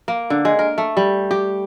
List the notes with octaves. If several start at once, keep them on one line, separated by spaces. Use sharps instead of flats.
A#3
D3
G#3
A#4
A3
G3
G4